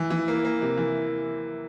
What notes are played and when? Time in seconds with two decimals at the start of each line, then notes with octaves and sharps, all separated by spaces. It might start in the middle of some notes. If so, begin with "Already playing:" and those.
Already playing: E3
0.10 E3
0.28 A#3
0.45 A#3
0.62 C3
0.78 E3